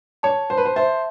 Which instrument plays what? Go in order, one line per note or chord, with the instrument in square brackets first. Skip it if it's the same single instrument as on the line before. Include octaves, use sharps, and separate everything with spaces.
[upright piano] C#5 [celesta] A5
[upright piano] C5 [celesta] A5
[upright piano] B4
C5
[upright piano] C5 [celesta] E5